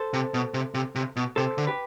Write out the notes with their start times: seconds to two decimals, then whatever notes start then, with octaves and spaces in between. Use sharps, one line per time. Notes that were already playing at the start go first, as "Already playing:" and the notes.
Already playing: A4 C5
0.13 C3
0.34 B2
0.54 C3
0.74 C3
0.95 C3
1.16 B2
1.36 C3 A4 C5
1.58 D3
1.67 G4 B4